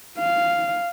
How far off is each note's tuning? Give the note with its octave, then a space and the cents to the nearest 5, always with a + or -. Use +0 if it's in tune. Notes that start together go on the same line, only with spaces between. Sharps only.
F5 -10